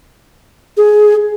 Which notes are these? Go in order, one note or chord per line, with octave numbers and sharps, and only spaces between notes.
G#4